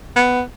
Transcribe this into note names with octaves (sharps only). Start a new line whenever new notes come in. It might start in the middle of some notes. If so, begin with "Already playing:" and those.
B3